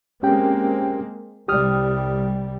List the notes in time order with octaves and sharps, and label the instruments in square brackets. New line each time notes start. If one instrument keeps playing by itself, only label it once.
[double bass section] G#3 A#3 C4 [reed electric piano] C#4 G4 G5
[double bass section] C2 G3 [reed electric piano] G4 D#6 F6